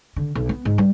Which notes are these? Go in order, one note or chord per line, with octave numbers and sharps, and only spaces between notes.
D3
B1
B3
G#2
G3